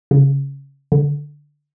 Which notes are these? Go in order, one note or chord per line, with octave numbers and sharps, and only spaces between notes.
C#3
D3